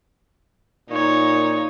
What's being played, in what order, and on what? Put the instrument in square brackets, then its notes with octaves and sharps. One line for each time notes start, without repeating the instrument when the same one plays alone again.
[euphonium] A#2 [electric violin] D#4 C#5